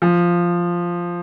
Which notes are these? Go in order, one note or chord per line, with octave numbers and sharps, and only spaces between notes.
F3